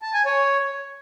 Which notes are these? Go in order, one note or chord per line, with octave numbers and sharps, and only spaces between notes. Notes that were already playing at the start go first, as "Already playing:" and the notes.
A5
G#5
C#5